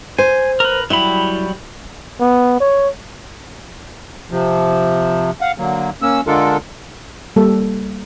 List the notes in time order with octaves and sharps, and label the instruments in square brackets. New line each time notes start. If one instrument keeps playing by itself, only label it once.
[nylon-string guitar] C5 [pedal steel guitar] G#5
[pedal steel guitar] A#4 B4
[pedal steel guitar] F#3 G3 B5 [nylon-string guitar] E4
[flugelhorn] B3
C#5
[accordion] C3 F3
F5 F#5
D3 F#3 A#3
A#3 C#4 E6
D3 G#3 D4 F4 A4 A#4
[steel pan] G3 A#3 A4